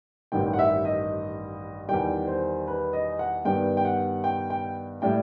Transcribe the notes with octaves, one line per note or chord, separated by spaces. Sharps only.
A1 G2 D#3 G5
F#5
E5
D#5
E2 D#3 G3 G5
C5
B4
D#5
F#5
G2 D#3 G3 B3 G5
G5
F#5
G5
G5
A2 G3 G5